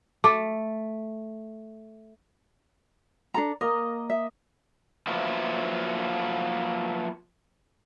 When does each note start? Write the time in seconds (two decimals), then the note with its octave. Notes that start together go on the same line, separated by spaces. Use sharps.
0.24 A3 D6
3.34 D4 A4 A#5
3.61 A#3 A#4 D#5
4.10 E5
5.07 F3 F#3 A#3 B3 E4